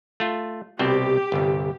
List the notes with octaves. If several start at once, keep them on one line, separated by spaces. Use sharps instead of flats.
A3 F4
C2 B2 C4 G4
G1 C2